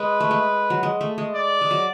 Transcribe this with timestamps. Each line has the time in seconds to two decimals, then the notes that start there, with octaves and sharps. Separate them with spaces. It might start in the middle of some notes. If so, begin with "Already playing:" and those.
Already playing: G#3 B4
0.20 A3
0.31 G#3
0.70 F#3
0.83 G#3
1.01 A3
1.18 G#3
1.35 D5
1.61 G#3
1.71 F#3